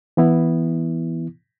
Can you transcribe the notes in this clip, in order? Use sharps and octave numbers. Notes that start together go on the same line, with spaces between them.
E3 B3 E4